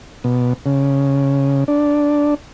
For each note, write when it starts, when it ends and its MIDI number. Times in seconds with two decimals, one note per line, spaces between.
0.24 0.53 47
0.66 1.64 49
1.68 2.34 62